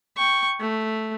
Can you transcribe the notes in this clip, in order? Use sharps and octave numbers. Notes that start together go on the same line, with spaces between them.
G5 C#6
A3